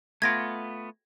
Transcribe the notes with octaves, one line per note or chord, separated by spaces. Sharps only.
A3 B3 F4 G#6 A#6 D7